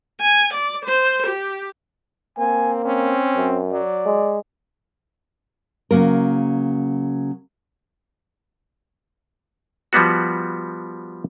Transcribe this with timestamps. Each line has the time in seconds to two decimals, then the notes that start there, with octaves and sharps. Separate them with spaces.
0.21 G#5
0.53 D5
0.85 C5
1.26 G4
2.38 A#3 C4 G#5
2.85 C4 C#4
3.36 F#2
3.72 F#3 D5
4.06 G#3
5.91 C#3 F#3 A#3 A#4
9.93 F3 G3 B3 F#4